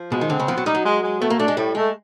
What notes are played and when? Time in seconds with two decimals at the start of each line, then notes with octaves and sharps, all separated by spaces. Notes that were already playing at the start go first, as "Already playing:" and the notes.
Already playing: F3
0.12 B2 G#3
0.21 D#3
0.30 D3 C4
0.40 C#3
0.48 F3 B3
0.58 F#3
0.66 G3 D#4
0.75 F#3
0.84 G#3
1.03 G#3
1.20 A3 B3
1.30 A#3
1.39 A3 D4
1.48 G#3
1.57 A2 G3
1.75 G#3 A3